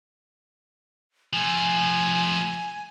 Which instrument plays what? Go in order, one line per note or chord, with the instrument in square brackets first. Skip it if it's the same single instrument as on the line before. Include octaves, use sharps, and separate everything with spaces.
[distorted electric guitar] F3 A3 [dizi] G#5